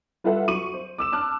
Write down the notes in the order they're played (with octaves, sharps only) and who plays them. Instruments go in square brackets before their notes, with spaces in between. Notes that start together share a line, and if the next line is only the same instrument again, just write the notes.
[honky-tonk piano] G3 F4 A4 B4 E5 F#5
F#3 C#6 D#7 F#7
C5
D6 E6 E7
A5 D6 F6 F#6